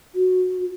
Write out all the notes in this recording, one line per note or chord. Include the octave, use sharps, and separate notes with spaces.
F#4